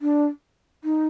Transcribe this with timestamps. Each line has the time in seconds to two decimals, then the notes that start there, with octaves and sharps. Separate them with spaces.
0.02 D4
0.84 D#4